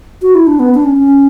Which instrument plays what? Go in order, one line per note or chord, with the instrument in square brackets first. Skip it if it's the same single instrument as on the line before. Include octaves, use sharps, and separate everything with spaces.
[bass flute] F#4
E4
D4
B3
D4
C#4
C#4